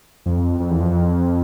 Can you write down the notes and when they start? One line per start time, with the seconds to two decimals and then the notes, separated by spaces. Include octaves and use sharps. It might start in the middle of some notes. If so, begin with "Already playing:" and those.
0.26 F2
0.60 F2
0.70 E2
0.80 F2